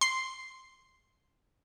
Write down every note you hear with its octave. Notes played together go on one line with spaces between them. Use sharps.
C6 C7